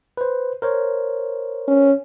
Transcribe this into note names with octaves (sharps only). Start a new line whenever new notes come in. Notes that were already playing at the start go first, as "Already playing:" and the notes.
B4 C5
A#4 C5 C#5
C#4